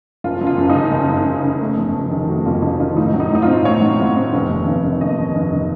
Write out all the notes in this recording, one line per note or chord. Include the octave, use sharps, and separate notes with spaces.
F#1 F4
F#2
F4
F#1
D#4
C#3
F#1
F#2
F#1
C#3
A3
F2
F1
D#3
A3 F#4
F2 F4
F1 D#4
D#3 F4
A2 D#4
F#3
D#4
A2 D#4
C4 F4
A2 C#5
F#3
A2
C4
F1
D#2
F1
D#3
F1 D#5
D#2
F1
D#3